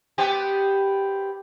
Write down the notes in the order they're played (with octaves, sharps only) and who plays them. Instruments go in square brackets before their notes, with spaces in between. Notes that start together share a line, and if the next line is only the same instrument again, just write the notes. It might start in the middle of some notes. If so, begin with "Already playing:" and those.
[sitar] B3 C4 G4